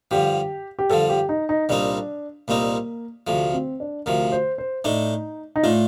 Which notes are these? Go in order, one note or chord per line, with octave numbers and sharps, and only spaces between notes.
G2 D3 F3 G4
G4
G2 D3 F3 A4
G4
D#4
D#4
C2 A#2 G3 C4 D4 D#4
C2 A#2 G3 A#3 C4 D#4
D2 C3 F3 A3
C4
D4
D2 C3 F3 A#4
C5
C5
A2 A3 D4 D#4
D#4
A2 A3 D4 F4